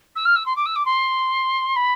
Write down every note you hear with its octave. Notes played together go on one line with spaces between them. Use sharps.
E6
F6
E6
C6
D6
E6
D6
C6
B5